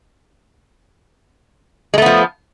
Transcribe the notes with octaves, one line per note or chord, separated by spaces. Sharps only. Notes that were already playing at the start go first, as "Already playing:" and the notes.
F3 G#3 A3 B3